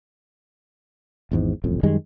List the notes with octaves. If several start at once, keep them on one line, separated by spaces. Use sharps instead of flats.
G#1 E2 G#2
D#1 A1 F2
F#2 D#3 G3 G#3